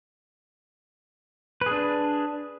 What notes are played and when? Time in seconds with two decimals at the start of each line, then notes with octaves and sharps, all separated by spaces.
1.61 B4
1.66 G#4
1.71 D4